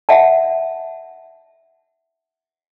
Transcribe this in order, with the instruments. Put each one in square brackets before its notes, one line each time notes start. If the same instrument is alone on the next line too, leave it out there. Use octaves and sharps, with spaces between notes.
[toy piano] E5 F#5 A5